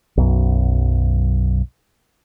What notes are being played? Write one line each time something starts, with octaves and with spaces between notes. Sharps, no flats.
B1 F#2